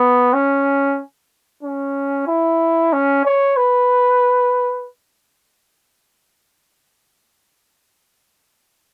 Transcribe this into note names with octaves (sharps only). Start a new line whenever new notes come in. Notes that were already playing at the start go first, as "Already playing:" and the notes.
Already playing: B3
C#4
C#4
E4
C#4
C#5
B4